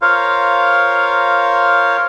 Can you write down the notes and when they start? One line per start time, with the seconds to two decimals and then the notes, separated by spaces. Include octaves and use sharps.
0.02 F4 A#4 C5 C#5 F5